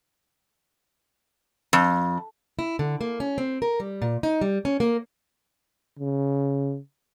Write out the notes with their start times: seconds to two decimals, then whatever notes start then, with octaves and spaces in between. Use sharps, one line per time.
1.73 F2
2.59 E4
2.79 D3
3.01 A#3
3.20 C#4
3.38 C4
3.62 A#4
3.80 G3
4.02 A#2
4.23 D#4
4.41 G3
4.65 C#4
4.80 A#3
5.99 C#3